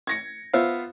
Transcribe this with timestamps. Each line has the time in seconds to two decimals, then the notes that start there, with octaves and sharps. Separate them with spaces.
0.07 G#6 A#6 C#7
0.54 B3 F4 C5 E5 F5